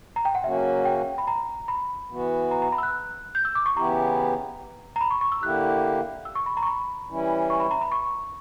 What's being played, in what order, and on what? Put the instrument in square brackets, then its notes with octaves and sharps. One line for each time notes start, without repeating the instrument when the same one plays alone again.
[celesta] A#5
G5
F#5
[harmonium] C#3 F#3 A#3 C#4 F#4 [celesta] E5
[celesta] G5
B5
A#5
B5
[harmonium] E3 B3 F#4
[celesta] A#5
A#5
B5
E6
F#6
G6
E6
D6
C#6
[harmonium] C#3 E3 B3 E4 G4 [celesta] A#5
[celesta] A#5
B5
C#6
C#6
E6
[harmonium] D3 A#3 E4 G4 [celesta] F#6
[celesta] E6
C#6
B5
A#5
C#6
B5
[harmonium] E3 G3 C#4 E4
[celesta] C#6
B5
A#5
B5
C#6